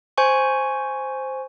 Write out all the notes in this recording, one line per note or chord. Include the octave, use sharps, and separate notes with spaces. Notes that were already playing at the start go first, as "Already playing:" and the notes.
C5 G#5 C#6